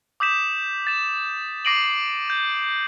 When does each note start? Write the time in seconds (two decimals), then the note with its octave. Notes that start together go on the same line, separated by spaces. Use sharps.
0.20 D6 D#6 G6 B6 E7
0.87 A6 E7
1.65 D6 A#6 C7 D7 D#7 F#7
2.30 G6